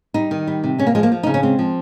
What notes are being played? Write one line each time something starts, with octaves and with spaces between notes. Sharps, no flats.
G3 D#4
D#3
G3
C3
G#3 C#4
A#3
F3 G#3
A#3
F3
C#3 D#4
C#4
G#3 C4
F3